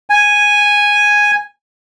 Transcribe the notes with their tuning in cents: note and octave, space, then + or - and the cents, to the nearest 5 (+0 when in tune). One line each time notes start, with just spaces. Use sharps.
G#5 -5